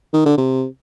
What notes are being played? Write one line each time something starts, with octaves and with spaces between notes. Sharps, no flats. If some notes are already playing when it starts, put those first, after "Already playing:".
D#3
D3
C3